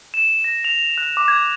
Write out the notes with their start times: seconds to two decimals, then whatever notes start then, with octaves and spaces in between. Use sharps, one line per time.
0.14 E7
0.44 A#6
0.64 F7
0.98 F#6
1.17 D6
1.28 G#6